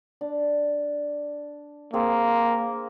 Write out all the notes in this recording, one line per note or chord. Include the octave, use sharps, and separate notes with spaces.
D4
A#3 C4 G#4